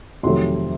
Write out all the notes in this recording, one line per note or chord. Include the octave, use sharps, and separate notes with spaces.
F2 C3 D#3 F#3 A3 C6